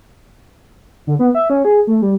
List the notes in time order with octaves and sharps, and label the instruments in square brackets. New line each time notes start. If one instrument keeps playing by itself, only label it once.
[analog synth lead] D3
B3
E5
C#4
G#4
A3
G3